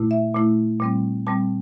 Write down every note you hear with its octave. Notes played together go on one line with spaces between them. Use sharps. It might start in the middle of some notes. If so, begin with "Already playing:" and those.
Already playing: A#2 A3 E4
E5
A#2 A3 E4
A#2 G3 C4
A#2 G3 C4 A5